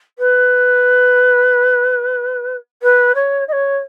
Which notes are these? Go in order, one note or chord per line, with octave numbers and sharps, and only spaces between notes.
B4
B4
C#5
D#5
C#5